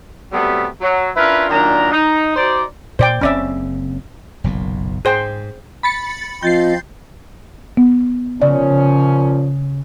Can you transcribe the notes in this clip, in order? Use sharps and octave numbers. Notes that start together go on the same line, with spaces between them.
C3 F#3 G3 A3 B3
F#3
C#4 D4 E4 F4 A#4 B4
F#2 A#2 D#3 D4 A#5
D#4
D#4 F#4 C5 D5
A#2 C5 D5 G5
F#1 C#3 C4 C#4 D5 E5
F#1 B1 A#2
G#2 G#4 C5 G5
B5 A6 C#7
F3 C4 F4 D#5 G6 A6 C7
B3
A#2 C#3 F3 C#4 D5